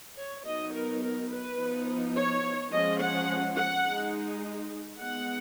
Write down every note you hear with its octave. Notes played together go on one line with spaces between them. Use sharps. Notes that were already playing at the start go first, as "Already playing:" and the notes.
C#5
F#3 B3 D#4 D#5
A#4
A#4
B4
F3 B3 D#4
C#5
F3 G#3 C#4 D#5
F#5
F#5
G#3 D#4
G#3 B3 D#4 F#5